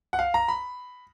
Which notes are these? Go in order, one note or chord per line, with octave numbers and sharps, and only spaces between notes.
F#5
F5
A#5
B5